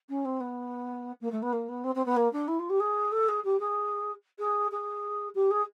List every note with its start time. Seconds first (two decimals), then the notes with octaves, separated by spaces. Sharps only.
0.09 C#4
0.25 C4
0.40 B3
1.21 A#3
1.32 A3
1.42 B3
1.52 A#3
1.68 B3
1.84 C4
1.95 C4
2.05 B3
2.16 A#3
2.33 D4
2.48 E4
2.59 F4
2.70 G4
2.80 G#4
3.12 A4
3.28 G#4
3.44 G4
3.60 G#4
4.39 G#4
4.71 G#4
5.35 G4
5.51 G#4